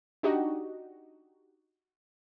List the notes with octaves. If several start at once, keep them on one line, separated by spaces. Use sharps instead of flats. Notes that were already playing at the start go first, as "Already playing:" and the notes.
D4 D#4 F#4 G4 D#5